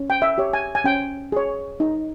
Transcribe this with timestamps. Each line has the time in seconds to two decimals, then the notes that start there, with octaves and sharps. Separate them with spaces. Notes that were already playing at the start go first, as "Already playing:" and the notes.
Already playing: C#4
0.10 G5
0.22 E5
0.38 G4 C#5
0.53 G#5
0.75 G#5
0.84 C#4 G5
1.32 G#4 C#5
1.80 D#4